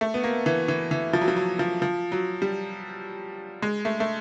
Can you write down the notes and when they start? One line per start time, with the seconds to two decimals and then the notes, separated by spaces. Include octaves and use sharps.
0.01 A3
0.14 B3
0.23 A#3
0.46 E3
0.68 E3
0.91 E3
1.13 F3
1.21 F#3
1.28 F3
1.36 F#3
1.59 F3
1.82 F3
2.12 F#3
2.42 G3
3.62 G#3
3.85 A3
4.00 A3